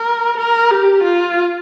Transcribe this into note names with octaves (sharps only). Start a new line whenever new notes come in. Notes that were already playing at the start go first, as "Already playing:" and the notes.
Already playing: A#4
A#4
G4
F4